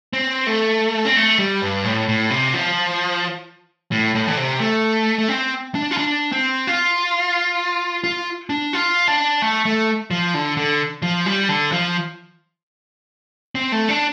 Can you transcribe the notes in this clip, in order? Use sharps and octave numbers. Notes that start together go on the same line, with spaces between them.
C4
A3
C4
A3
G3
G2
A2
A2
C3
F3
A2
A2
D3
C3
A3
A3
C4
D4
F4
D4
C4
F4
F4
D4
F4
D4
A3
A3
F3
D3
D3
F3
G3
D3
F3
C4
A3
D4